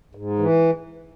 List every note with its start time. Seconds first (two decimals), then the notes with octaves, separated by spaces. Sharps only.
0.15 G#2
0.39 E3